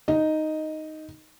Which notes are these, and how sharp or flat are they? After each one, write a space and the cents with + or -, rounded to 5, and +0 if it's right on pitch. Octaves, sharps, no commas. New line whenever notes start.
D#4 +0 D#5 +0